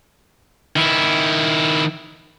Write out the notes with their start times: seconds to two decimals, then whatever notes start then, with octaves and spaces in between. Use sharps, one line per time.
0.76 D#3 E4